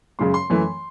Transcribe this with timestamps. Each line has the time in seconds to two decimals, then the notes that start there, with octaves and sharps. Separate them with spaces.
0.19 F#2 C#3 G#3 C6
0.34 C6
0.50 F#2 E3 A3